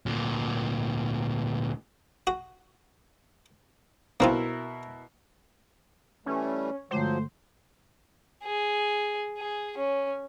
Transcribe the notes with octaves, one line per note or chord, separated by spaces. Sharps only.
D2 A#2
F#4
B2 A#3 C4 E4 F4 A#4
E3 G3 A3 C#4
G2 D3 F3 F#3 G#3 A3 C5
G#4
G#4
C#4